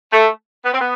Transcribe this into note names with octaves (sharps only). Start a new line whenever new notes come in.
A3
B3
C4
B3